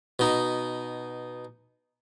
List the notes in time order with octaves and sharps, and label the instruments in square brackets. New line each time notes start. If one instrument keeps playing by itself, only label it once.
[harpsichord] B2 D#4